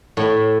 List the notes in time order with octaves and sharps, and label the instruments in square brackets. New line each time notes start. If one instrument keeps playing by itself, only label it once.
[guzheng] A2